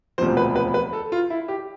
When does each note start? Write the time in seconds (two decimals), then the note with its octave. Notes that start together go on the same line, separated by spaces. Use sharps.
0.18 E1 D2 C3 F3 C5
0.37 B4
0.56 B4
0.74 B4
0.93 A4
1.12 F4
1.30 E4
1.48 G4